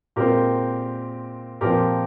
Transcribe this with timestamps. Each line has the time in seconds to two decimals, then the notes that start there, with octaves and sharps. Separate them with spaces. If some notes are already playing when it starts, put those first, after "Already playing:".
0.16 A#2 G#3 C4 G4 A#4
1.61 A#2 F3 C4 G4 A#4